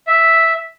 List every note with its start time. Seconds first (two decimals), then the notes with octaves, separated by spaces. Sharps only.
0.07 E5